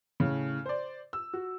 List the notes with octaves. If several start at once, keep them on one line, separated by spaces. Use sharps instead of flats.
A2 C#3
C5 D5
E6
F#4